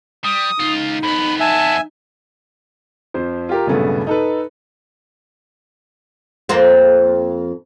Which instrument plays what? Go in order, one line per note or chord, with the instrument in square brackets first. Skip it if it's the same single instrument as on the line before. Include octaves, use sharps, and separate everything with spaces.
[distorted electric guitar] G3 [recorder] D#6
[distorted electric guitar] C#2 F4 [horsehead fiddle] D#4
[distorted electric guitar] F2 B3 [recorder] B5
[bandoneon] E5 G#5 [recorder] A5
[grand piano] F2 F3 C5
F4 G4 A#4
B1 G2 A#2 C#3 A3 B3
D#4 A4 B4
[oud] F2 A#3 C4